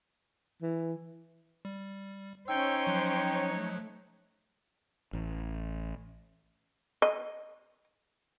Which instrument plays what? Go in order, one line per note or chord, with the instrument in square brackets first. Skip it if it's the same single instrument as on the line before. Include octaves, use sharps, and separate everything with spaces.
[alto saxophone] E3
[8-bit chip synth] G3
[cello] C#4 C5 [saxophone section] D#4 C#5 [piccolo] G5 [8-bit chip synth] E6
[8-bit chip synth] F3 F#3 F#6
[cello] A3
[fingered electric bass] A1
[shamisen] D#5